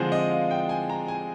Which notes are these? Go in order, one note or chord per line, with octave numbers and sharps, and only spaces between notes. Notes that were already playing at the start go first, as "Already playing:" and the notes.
Already playing: D3 F3 G#3 C4 G#4 C5
D#5
F5
G5
G#5
A#5
G#5